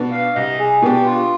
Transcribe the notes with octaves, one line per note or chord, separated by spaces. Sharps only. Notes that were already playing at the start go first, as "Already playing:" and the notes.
Already playing: B2 B3 D4
F5
C2 D#5
G#4
B2 B3 D4 G4
F4